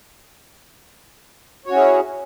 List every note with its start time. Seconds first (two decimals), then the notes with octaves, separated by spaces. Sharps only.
1.65 C#5
1.68 F#4
1.71 C#4
1.74 E4
1.77 G#4